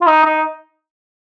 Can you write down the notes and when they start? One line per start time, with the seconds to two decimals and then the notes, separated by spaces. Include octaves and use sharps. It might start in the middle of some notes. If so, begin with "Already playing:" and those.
0.01 F4
0.07 D#4
0.25 D#4